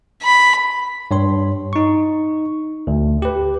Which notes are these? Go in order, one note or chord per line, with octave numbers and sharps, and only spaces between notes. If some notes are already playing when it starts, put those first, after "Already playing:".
B5
G2 C#5 C6
D#4 C#6
D2
G4 B4